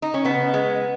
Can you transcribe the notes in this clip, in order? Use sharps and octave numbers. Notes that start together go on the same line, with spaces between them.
D#4
C#4
C#3 B3
G#3